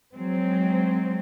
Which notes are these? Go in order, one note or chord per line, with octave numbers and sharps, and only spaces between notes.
F#3 G#3 C4